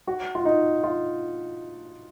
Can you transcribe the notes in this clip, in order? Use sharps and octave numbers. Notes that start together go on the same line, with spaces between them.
F#4
F4
D#4
F4